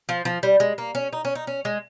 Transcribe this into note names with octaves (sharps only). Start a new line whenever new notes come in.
F3
F3
G3
G#3
A#3
C#4
D#4
C#4
D#4
C#4
G#3